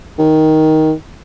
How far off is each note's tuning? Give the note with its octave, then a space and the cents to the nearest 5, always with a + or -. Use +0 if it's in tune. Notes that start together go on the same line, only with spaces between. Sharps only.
D#3 +10